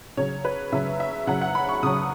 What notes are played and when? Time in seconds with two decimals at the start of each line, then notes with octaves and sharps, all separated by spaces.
0.17 C#3 F#3 C#5
0.45 B4
0.72 C#3 F#3 E5
1.00 E5
1.27 C#3 F#3 F#5
1.41 F#5
1.55 B5
1.69 C#6
1.83 C#3 F#3 D#6